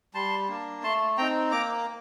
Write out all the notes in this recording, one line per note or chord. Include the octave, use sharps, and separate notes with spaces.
G3 A5 C6
A#3 D4
A3 A5 C6
C4 D#4 G5 A#5
A#3 A#5 D6